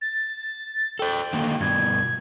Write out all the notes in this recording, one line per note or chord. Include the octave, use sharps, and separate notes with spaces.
A6
A4 C5 G5
D3 D#3 A#3
G2 B2 G#6